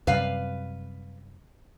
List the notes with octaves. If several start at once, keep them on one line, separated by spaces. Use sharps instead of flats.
F#2 C3 G3 B4 F5